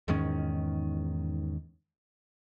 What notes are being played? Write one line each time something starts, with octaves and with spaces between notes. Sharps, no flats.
E2 G#2 D#3 C#4